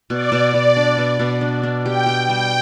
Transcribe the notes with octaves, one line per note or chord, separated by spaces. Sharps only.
B2 D5
B2
B2 D5
D4
B2
B2
D4
D4
G4 G5
G4
G3 G5